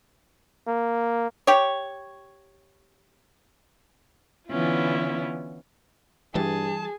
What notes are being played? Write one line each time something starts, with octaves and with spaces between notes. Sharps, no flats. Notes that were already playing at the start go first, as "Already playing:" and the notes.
A#3
G4 C#5
D3 E3 B3 C#4 E4 F4
G2 E3 G3 G#4 A5